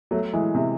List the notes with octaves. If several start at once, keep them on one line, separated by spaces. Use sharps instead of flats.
F#3 A3
E3 G#3
C3